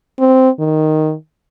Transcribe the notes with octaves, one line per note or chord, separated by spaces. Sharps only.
C4
D#3